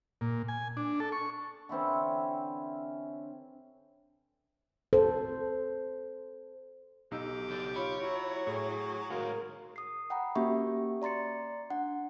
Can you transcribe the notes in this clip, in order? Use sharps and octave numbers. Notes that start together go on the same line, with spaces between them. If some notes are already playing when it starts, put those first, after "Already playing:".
A#2
G#5
D4
A4
C#6
D3 E3 C4 C#4
A4 C5
B1 D#4 G4 E6
C#3 A4
F4 C#5 B5
F#3 E4
A2 G#4
A2 D#3 G#3 F#4 G#4 A#4 F5
D#6 C7
F#5 G5 A#5 B5
A#3 C#4 F#4 G4 E5 C#6
D5 A#5 C6 A6 C#7
D4 F#5